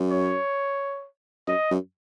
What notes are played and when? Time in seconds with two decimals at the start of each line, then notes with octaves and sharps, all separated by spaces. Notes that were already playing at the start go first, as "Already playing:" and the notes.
Already playing: F#2
0.11 C#5
1.47 F#2 D#5
1.71 F#2